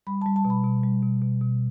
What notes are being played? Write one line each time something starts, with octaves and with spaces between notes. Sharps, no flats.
G3 B5
G3 A5
A5
B2
B5
B2
G3
B2
B2
B2